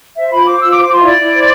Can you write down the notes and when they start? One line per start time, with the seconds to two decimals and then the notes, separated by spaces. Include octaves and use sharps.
0.17 C5 E5
0.31 F4 B5
0.46 C5 D6
0.60 F4 E6
0.71 D6
0.75 C5
0.82 D6
0.90 F4 C6
1.00 E5
1.04 E4 D5
1.19 E4
1.33 C5